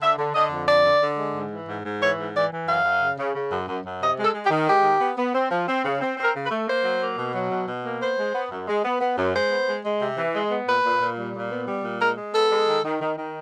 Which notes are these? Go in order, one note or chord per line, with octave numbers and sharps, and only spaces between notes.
D3 E5
D3
D3 D#5
F2
D3 D5
D3
D3
G#3
G#2
E3
G#2
G#2
E3 C#5
G#2
E3 D5
E3
F#2 F5
F#2
C#3
C#3
C#3
F#2
F#2
F#2
C3 D#5
G#3
A4
G#3
G4
D#3
G#3 G4
D#3
B3
B3
C4
F3
C4
C#3
C4
C4
A#4
C#3
B4
A3
A#3 C5
F#3
A#3
B2
F#3
B2
B2
A#3
B3 C5
G#3
B3
F#2
G#3
B3
B3
F#2
G#3 C5
B3
G#3
G#3
C3
E3
G#3
B3
A#2 B4
A#2
A#2
G3
A#2
B3
G3
A#2
G#3 A#4
G#3
B3 A4
G#3
D#3
D#3
D#3
D#3